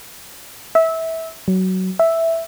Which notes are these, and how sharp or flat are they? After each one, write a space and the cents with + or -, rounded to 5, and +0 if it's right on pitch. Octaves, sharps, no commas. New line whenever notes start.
E5 -20
F#3 +15
E5 +0